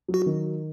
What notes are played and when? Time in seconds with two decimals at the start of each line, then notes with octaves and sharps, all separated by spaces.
0.08 F#3
0.14 F#4
0.26 D#3